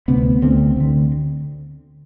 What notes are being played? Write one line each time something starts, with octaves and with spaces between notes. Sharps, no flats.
D2 C3 B3
D2 D3 C4
D2 D3